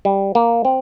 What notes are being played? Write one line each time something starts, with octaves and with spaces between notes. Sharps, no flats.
G3
A#3
C4